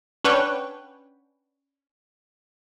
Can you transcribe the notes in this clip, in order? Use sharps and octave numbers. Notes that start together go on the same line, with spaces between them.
C#4 D4 B4 C#5 F#5 G5